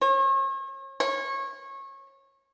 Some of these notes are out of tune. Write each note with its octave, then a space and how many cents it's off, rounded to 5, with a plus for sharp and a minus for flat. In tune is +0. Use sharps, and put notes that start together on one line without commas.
C#5 -40
C#5 -25